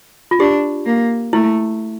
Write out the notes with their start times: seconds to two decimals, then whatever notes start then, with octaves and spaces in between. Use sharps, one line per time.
0.31 F4
0.39 D4 G4
0.86 A#3
1.33 A3 E4